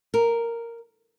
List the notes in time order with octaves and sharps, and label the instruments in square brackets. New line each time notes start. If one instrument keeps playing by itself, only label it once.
[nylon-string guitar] A#4